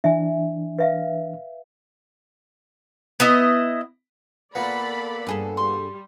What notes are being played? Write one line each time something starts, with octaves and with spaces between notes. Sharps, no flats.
E3 D4 E5 G#5
B4 E5 F5
B3 E4 D#5
A#2 B3 A4 D5 B5
G2 G#4 A4
G3 C6